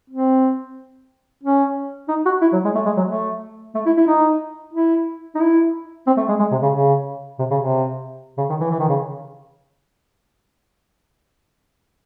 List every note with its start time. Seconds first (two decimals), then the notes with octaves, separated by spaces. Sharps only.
0.10 C4
1.43 C#4
2.08 D#4
2.26 F#4
2.42 E4
2.53 F#3
2.65 G#3
2.75 A3
2.86 G#3
2.97 F#3
3.09 A3
3.75 A3
3.86 E4
3.97 E4
4.07 D#4
4.74 E4
5.35 D#4
5.40 E4
6.07 C4
6.17 A3
6.29 G#3
6.39 G#3
6.51 C3
6.62 C#3
6.73 C#3
7.39 C3
7.51 C#3
7.61 C3
8.38 C#3
8.50 D#3
8.61 E3
8.71 E3
8.79 D#3
8.89 C#3